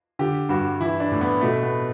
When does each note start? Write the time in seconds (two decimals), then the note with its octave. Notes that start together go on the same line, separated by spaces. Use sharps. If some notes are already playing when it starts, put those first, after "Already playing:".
0.19 D3 G4
0.49 G2 F#4
0.80 E3 E4
1.00 D4
1.12 A2
1.21 B3
1.41 B2 A3
1.63 B3